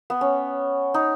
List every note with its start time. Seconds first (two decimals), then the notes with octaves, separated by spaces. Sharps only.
0.10 B3
0.21 C#4
0.94 D#4